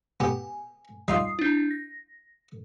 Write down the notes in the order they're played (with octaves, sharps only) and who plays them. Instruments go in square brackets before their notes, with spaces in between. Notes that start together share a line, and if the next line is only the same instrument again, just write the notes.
[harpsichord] B3 G4 [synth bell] G#5
[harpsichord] G3 D#4 F4 [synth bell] D#6 C7
[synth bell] D4 E4
A#6